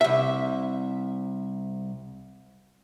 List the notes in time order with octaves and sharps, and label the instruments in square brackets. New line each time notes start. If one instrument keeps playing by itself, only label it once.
[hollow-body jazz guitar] C2 E5